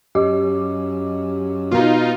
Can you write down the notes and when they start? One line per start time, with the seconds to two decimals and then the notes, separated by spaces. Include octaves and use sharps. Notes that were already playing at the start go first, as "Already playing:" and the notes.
0.15 F#2 G4 D#5 D6
1.71 B2 B3 D#4 F4